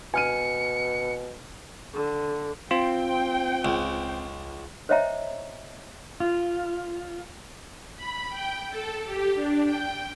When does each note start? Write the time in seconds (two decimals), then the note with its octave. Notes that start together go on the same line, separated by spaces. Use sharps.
0.14 B2 G#5 F6 C#7 D#7
1.94 D3
2.71 C4 F4 G5
3.65 C#2
4.89 C5 C#5 D#5 E5 G5 A#5
6.20 F4
7.97 B5
8.29 G5
8.70 A4
9.04 G4
9.35 D4
9.65 G5